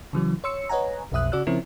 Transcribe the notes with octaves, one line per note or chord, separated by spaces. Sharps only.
C#3 E3 F#3
C#5 C6 E6 C#7
B4 C#5 D#5 F#5 G#5 A#5
B1 F2 B2 E5 D#6 F#6
C#3 F#4 D5 E6 F#6
C#3 F3 C4 C#4 E4 A#4